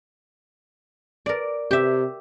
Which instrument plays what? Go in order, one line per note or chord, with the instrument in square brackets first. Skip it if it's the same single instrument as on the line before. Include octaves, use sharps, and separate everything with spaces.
[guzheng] A#4 D5
[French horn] C3 [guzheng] G4 E5